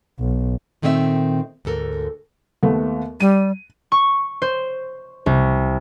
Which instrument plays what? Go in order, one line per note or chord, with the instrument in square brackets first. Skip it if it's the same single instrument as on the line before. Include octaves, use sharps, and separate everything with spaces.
[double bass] B1
[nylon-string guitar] A#2 D#3 A3 C4 D5 E5
D2 G#2 A4 A#4
[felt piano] D#2 A3 B3
[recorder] G3 [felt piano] D#7
[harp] C#6
C5
C2